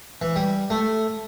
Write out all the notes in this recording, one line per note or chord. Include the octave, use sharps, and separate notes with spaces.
E3
G3
A3